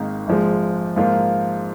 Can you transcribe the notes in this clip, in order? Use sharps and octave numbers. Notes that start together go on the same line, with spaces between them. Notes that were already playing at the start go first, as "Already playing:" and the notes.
Already playing: G#1 G#2 D#3 A#3 D#4
A#1 G#2 F3 G#3
G#2 F3 A#3 F4